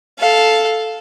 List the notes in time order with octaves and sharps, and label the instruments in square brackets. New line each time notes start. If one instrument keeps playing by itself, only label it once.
[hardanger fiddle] A4 F5